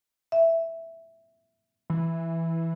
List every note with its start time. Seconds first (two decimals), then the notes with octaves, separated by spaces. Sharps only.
0.32 E5
1.90 E3